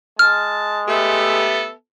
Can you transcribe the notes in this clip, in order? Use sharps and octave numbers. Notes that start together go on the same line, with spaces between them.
G#3 A5 F6
A3 B3 G4 A4 E5